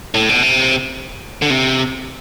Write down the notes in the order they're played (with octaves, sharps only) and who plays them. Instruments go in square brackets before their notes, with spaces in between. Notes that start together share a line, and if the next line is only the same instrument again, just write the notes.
[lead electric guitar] A2
B2
C3
D3
C3